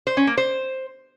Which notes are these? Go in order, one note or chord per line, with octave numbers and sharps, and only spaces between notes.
C5
C#4
A#3
C5